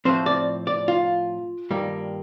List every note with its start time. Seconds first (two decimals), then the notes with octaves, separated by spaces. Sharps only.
0.05 A2 F3 C4 C5
0.26 D5
0.67 D5
0.88 F4
1.71 G2 D#3 G3 A#3